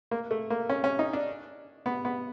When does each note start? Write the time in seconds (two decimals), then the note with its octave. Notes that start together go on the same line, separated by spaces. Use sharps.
0.11 A#3
0.31 A3
0.50 A#3
0.69 C#4
0.84 C#4
0.99 D#4
1.13 D4
1.86 B3
2.05 B3